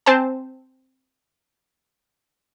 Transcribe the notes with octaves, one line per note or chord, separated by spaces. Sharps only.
C4 C5 G#5 A5